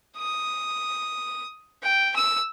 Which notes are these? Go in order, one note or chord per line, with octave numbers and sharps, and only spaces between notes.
D#6
G5
E6